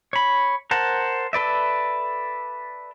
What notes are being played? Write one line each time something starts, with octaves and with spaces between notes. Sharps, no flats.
C#5 B5
A#4 C5 F#5 A5
A4 B4 D5 E5